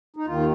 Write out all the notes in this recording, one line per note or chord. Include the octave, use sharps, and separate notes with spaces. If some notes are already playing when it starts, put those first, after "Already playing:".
D#4
D#2 D#3 F4